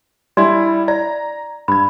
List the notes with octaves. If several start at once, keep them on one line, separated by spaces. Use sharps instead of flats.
G3 D4 E4 D5 C6
D5 A#5
G2 B5 G#6